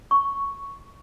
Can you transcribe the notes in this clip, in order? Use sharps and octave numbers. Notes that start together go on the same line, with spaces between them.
C#6